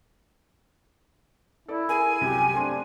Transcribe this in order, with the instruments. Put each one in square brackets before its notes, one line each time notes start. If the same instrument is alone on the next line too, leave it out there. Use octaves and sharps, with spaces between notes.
[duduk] E4 [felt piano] A4 D5
[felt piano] G#4 A#4 [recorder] G#5
[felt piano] C2 F#2 [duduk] G4
[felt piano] A3 C4 C6 [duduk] D4